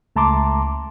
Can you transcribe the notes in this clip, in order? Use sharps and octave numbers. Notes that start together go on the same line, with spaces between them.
C#2 A3 A5 A#5 C6 D6